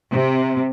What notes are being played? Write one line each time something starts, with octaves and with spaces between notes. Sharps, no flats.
C3